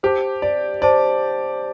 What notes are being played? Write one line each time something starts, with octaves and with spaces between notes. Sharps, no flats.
G4 C5 A5 D6
D5
C5 D5 A5 D6